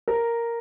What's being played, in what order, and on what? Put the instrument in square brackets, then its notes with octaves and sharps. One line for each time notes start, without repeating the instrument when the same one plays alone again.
[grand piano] A#4